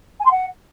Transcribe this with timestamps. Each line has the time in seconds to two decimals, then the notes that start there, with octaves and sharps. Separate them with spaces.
0.20 G#5
0.25 C6
0.31 F#5